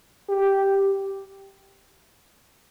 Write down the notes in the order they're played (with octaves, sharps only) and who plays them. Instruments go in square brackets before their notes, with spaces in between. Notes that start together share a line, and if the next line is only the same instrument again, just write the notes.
[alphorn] G4